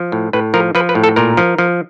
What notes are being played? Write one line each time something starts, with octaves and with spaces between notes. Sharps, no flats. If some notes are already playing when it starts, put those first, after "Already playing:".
Already playing: F3
A2
A2 B4
F3 A#4
F3 B4
B4
A2
A4
A#2 A#4
F3
F3